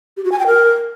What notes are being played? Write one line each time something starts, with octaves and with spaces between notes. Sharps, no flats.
G4
F#4
G#5
G5
A#4